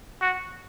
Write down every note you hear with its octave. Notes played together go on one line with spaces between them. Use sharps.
F#4